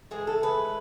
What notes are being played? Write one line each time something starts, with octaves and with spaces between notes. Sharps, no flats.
A2 E3 G#3 G#4
A4
B4